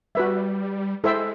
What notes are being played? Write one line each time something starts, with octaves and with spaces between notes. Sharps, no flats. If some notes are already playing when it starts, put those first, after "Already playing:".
G3 F#4 B4 E5
G#3 E4 A4 C5 E5 G5